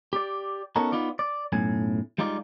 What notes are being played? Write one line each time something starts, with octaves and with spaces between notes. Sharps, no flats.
G4 D5
B3 C#4 D#4 F#4 A4 A#4
B3 D#4 F4 D5
D5
B1 F#2 A2 G#5
G3 G#3 D#4 F4 D5